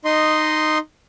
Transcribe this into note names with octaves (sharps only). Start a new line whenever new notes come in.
D#4 D#5 C6